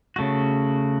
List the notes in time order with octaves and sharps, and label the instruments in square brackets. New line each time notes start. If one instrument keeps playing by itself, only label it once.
[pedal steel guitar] C#3 A3 F#4